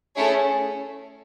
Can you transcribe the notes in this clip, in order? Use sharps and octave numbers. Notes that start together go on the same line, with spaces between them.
A3 C#4 E4 G#4 C#5